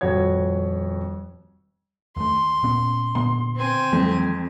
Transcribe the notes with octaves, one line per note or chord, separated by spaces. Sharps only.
D#1 F2 F#4 C#5 G#6
D#2 A3 C6
A#2 B3 C#4
A#2 D3 B3 C6
C4 G#5
F2 E3 F#3 G#3